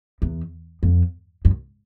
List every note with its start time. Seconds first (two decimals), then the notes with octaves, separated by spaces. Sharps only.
0.22 E2
0.83 F2
1.45 F#2